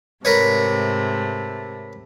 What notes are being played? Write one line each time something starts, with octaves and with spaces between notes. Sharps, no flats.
G#2 C3 A3 A#4 B4 C#5